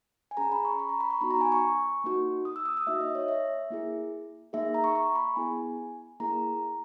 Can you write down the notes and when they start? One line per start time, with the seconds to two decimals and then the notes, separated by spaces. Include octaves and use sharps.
0.31 G#5
0.37 C#4 G#4 A#5
0.52 B5
0.65 C#6
0.79 B5
0.89 A#5
1.00 B5
1.10 C#6
1.21 B3 D#4 F#4 B5
1.30 A#5
1.41 G#5
1.52 C#6
2.04 A#3 D#4 F#4
2.45 D#6
2.56 E6
2.66 D#6
2.77 D#6
2.87 A#3 D#4 F#4 E5
3.01 D#5
3.15 C#5
3.28 E5
3.70 A#3 E4 G#4
4.53 A#3 D#4 G#4 E5
4.74 A#5
4.84 C#6
4.95 C#6
5.16 B5
5.36 B3 E4 G#4 G#5
6.20 A#3 E4 G#4 A#5